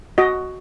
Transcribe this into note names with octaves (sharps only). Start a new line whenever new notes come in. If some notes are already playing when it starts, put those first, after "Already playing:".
F#4 D#5